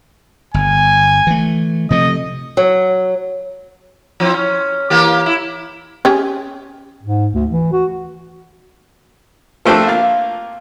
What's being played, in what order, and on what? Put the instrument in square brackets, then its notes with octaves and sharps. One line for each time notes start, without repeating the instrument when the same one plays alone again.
[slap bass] G1 [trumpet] G#5
[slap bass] E3 A3
[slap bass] C3 F3 A3 [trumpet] D#5
[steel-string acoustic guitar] F#3
[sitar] F3 C4 E4
C#4
E3 A#3 G4
E4
[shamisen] C#4 G4 G#4
[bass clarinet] G#2
D2
E3
F#4
[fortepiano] F3 A3 C4 D4
A#3 F4